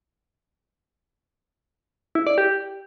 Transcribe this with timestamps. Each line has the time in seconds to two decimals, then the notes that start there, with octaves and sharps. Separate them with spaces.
2.15 E4
2.27 D5
2.38 G4